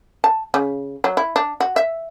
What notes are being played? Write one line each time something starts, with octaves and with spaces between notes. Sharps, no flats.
A5
C#3
F#3
E4
D4
F#4
E5